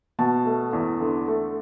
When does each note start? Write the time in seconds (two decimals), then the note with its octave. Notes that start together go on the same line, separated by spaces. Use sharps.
0.19 B2 A5
0.45 A3
0.73 E2
1.00 D3
1.28 A3